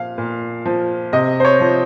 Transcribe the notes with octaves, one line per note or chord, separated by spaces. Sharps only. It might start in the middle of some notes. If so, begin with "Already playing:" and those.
Already playing: A#2 F3 F5
A#2
F3
C3 D#5
C5
C#5
F3